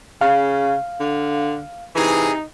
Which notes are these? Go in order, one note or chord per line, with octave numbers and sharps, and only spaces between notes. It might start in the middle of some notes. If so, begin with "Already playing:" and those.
C#3 F5
D3
C3 E3 D#4 G#4